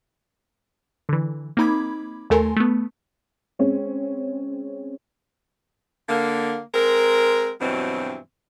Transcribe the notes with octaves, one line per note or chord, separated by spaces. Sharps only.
D3 E3
A#3 C4 D#4 B5 D6 G#6
D#2 A3 A4 A#4 G#5 C6
A3 B3
G#3 C4 C#4
D3 A#3
G#3 C4 A#4
G2 B2 E3 F#3 C4